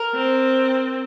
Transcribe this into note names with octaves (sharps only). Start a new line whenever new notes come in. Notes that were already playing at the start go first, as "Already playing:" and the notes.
Already playing: A#4
C4